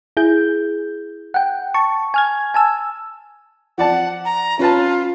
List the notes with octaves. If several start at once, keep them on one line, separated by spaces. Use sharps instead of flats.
E4 G#4 G6
F#5 G5
A5 C#6
G#5 F6 G#6
G#5 A5 E6
F3 D5 F#5 A5
A#5
C#4 F4 B4 A5